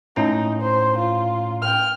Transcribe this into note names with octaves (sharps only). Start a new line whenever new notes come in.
A2 C#4 D#4 A#5
C5
F4
G5 F6